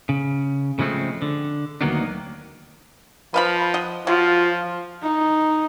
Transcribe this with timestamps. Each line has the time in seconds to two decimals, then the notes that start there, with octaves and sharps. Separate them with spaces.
0.09 C#3
0.79 C#3 F3 G#3 A3 C4
1.22 D3
1.81 D2 D#3 F#3 A#3 B3 D4
3.34 F3 B4 F5 B5
3.74 D#5 F#5
4.07 F3 F#3 F4
5.03 D#4